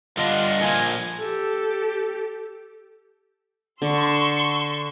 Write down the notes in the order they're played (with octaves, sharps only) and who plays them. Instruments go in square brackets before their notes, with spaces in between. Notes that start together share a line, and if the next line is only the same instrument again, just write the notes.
[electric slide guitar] G2 D3 D4 [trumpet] F4 [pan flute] D#5
[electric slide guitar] A#2 D#3 F3 [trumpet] G#5
[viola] G4 A4
[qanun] D3 [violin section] C6 C#6 E6